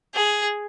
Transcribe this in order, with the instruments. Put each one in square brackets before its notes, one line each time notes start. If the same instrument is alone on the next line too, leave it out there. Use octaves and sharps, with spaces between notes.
[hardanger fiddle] G#4